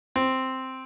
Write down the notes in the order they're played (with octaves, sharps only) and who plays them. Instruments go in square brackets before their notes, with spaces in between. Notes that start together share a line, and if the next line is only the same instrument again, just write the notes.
[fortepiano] C4